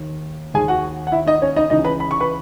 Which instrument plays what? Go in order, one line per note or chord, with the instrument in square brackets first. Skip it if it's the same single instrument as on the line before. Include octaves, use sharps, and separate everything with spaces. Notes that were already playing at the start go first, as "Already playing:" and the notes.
Already playing: [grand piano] D#2 D#3
D#2 G#4 G#5
D#3
F#4 F#5
F#5
E4 E5
D#4 D#5
C#4 C#5
D#4 D#5
C#2 C#3 E3 D#4 D#5
B4 B5
B5
C#6
B4 B5